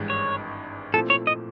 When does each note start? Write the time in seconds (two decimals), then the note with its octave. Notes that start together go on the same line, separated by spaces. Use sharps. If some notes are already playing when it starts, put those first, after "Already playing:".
Already playing: G#1 G2 E3 G#3
0.10 C#5
0.93 A#2 F3 A3 C4 E4 A4
1.10 C#5
1.27 D#5